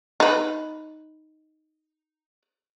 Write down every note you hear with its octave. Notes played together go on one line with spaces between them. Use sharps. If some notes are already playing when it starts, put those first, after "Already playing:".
D#4 B4